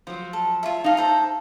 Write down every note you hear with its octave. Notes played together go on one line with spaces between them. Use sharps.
F3 F#3 C5
A4
F4 C#5 E5
D#4 A4 D#5 F5
A4 C5 E5